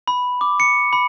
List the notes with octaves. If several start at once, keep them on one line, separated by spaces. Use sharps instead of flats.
B5
D6
C#7
B5